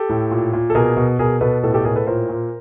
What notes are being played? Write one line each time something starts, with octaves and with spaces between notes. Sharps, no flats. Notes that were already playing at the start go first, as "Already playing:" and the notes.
Already playing: G4 A4
A2
A#2
A#2
A4
B2 G#4 A#4
B2
B2 G#4 A#4
B2 A4 B4
A2 A4 B4
G4 A4
A2 G#4 A#4
A4 B4
A#2 A#4 C5
A#2